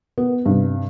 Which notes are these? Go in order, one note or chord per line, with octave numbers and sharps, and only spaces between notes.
B3
G2 C3